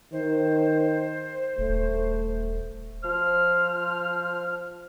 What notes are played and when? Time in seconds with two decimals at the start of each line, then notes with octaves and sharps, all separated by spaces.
0.12 D#3 C5
1.58 D#1 A3
3.03 F3 C5 F6